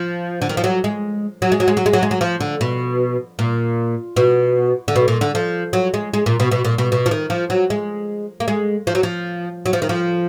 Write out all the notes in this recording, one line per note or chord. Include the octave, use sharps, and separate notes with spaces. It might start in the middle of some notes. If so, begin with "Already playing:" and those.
Already playing: F3
D3
D#3
F3
F#3
G#3
F#3
G#3
F#3
G#3
F#3
G#3
F#3
G#3
F#3
F3
D3
B2
A#2
B2
D3
B2
A#2
D3
F3
F#3
G#3
G#3
A#2
B2
B2
A#2
B2
B2
F3
D#3
F3
F#3
G#3
A#3
G#3
F3
F#3
F3
F#3
F3
D#3
F3